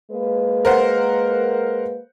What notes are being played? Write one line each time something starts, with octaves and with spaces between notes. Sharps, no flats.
G#3 A#3 B4
A#4 C5 F#5